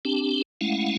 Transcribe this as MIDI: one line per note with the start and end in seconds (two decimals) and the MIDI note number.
0.05 0.42 60
0.05 0.42 62
0.05 0.42 67
0.61 0.97 56
0.61 0.97 57
0.61 0.97 61
0.61 0.97 64
0.61 0.97 77
0.61 0.97 78